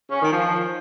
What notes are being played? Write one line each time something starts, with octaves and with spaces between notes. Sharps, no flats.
C#4
D#3
F3